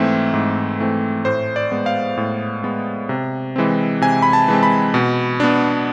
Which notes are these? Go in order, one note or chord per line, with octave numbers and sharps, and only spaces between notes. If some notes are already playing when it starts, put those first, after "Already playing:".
Already playing: G#2 E3 A3 C4 E5
G#2
E3 A3 C4
A2 C5
D5
G#3 B3
F5
A2
G#3 B3
C3
E3 G#3 C4
C3 G#5
B5
A5
E3 G#3 C4
B5
B2
B3 D4